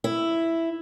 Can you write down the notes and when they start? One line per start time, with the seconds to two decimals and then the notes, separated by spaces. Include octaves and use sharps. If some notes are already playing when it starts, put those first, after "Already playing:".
0.04 E4